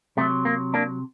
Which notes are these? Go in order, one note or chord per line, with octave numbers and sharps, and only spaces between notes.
C3 F#3 A3
A#3
A#3 D4